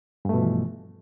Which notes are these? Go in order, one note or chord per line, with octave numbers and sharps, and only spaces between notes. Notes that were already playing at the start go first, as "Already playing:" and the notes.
G2 B2 E3 F3 A3